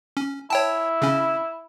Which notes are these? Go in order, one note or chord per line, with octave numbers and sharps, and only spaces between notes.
C#4
E4 C#5 G5 A5
C#3 C#4